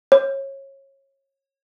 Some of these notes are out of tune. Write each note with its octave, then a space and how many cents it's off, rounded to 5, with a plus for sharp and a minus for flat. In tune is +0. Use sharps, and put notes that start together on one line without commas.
C#5 -25